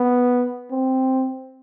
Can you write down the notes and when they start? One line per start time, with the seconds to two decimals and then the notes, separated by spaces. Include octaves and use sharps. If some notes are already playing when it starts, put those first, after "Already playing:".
Already playing: B3
0.71 C4